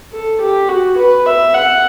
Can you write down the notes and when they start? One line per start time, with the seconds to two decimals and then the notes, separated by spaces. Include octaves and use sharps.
0.12 A4
0.40 G4
0.68 F#4
0.97 B4
1.26 E5
1.54 F#5